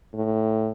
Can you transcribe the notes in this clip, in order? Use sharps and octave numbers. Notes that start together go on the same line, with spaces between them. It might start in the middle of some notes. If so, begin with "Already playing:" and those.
A2